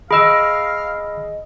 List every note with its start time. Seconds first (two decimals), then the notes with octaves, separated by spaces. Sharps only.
0.11 G#4 D#5 F5 B5 E6